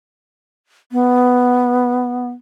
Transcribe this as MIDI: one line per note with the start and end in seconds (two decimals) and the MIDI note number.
0.92 2.28 59